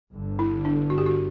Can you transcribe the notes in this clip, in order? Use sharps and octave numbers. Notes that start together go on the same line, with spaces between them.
G1 G2 D3
E4
D4
F#4
G4
F#4